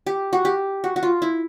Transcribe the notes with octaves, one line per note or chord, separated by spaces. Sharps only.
G4
F#4
G4
F#4
F#4
F4
E4